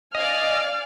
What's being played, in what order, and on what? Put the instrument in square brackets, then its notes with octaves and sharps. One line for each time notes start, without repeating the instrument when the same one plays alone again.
[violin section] D5 F5 G#5 [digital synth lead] D#5 [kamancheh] F6